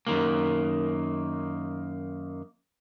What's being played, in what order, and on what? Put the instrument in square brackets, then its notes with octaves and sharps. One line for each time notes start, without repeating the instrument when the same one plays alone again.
[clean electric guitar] F#2 D#3 A#3